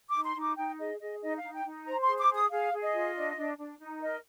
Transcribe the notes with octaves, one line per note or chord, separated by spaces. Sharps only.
D6
D#4
C6
D#4 D6
D#4 G5
G#4 D#5
G#4 D#5
D#4 D#5
F5
D#4
G5
D#4
C5 A#5
C6
G#4
D6
G#4 D#6
G#4 F5
G#4
D#5
F4
D4
D4
D4
D#4
A#4 D#5